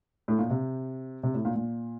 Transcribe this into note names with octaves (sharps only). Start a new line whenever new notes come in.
A2
A#2
C3
C3
A2
A#2
A#2